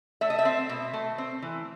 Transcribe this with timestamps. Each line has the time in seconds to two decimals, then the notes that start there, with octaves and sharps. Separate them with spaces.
0.21 A3 E5
0.30 D#5
0.39 E5
0.45 C4
0.69 B2
0.93 A3
1.18 C4
1.42 E3